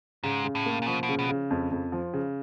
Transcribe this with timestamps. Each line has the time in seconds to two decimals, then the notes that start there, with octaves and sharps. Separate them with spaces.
0.24 G#2 C#3
0.44 C#3
0.55 A2
0.66 A#3
0.82 A#2
0.87 B2 F3
1.03 B2
1.09 C#3
1.19 B2
1.29 C#3
1.50 F2
1.71 F2
1.92 F3
2.14 C#3